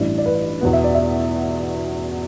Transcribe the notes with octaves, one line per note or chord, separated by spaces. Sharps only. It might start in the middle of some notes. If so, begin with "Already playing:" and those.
Already playing: A1 G2 E3 D5
D5
B4
E2 B2 B3
E5
D5
E5